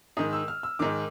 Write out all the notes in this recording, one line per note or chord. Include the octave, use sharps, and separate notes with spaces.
G#2 D#3 D#6
E6
F6
E6
G#2 D#3 D6